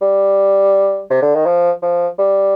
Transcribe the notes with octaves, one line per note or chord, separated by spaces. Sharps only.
G3
C3
D3
D#3
F3
F3
G3